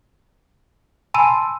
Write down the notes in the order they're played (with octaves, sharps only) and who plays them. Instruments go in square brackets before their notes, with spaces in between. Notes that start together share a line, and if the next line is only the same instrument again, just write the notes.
[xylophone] G#5 B5 D#7 [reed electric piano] A5 C6 E6